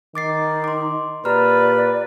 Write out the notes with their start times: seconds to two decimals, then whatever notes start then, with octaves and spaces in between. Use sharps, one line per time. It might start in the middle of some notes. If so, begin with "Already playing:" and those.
0.15 D#3 D#4 D6 A6 C7
0.64 C6 D6
1.25 A#2 G4 B4 D5 A#5 F6